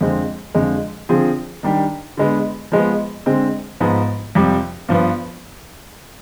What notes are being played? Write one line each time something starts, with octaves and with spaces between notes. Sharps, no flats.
F2 D3 G#3 C4
F2 D3 G#3
D3 F3 C4 F4 G#4
D#3 G3 D4 G4
D3 G#3 B3
F3 G#3 B3
D3 G#3 C4
G#2 F3 B3
F2 C3 G3
G2 F3 B3